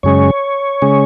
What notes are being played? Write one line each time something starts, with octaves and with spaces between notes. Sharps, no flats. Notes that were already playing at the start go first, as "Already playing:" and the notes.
F#2 C#3 G#3 C#4 C#5
C#3 G#3 C#4